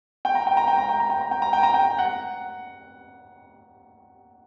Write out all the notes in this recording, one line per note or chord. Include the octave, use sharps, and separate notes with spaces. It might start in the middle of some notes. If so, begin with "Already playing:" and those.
G5
A#5
G5
A#5
G5
A#5
G5
A#5
G5
A#5
G5
A#5
G5
A#5
G5
F#5